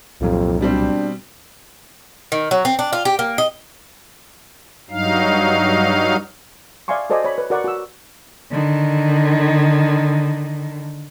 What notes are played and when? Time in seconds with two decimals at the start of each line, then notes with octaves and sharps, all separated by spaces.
0.21 C2 F2 A#2 F#3
0.61 B2 G3 C4 D4
2.32 D#3
2.51 F#3
2.65 C4
2.79 D4
2.93 F4
3.05 G4
3.19 A#3
3.38 D#5
4.90 G2 F#3 D#4 F5
6.88 D5 E5 F5 G#5 C6 C#6
7.10 F#4 A4 C5 D5 D#5 G#5
7.25 C#5 B5
7.38 B4
7.50 F#4 A#4 D5 F#5 C#6
7.64 F#4 E6
8.51 D3 D#3